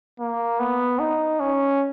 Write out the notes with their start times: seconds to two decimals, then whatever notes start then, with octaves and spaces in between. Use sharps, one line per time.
0.20 A#3
0.60 B3
0.99 D#4
1.40 C#4